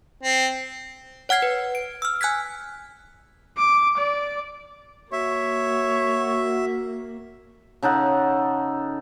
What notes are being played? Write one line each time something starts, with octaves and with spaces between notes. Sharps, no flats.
C4
C#5 F#5 F6 G#6 C7
B4
D7
E6 F6
G#5 F#6 G#6 B6
D6
D5
A#3 F#4 C#5 E5
C#3 D#4 A4 F#5